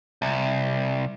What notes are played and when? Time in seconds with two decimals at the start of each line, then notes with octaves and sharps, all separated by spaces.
0.22 C2